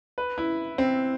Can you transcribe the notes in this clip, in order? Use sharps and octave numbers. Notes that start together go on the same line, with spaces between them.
B4
E4
C4